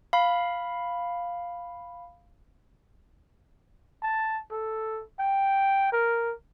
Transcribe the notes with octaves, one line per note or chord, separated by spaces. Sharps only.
F5 B5
A5
A4
G5
A#4